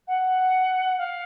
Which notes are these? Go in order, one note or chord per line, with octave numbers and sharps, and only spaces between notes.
F#5
F5